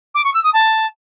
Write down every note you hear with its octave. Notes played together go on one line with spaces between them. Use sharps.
D6
C#6
E6
D#6
A5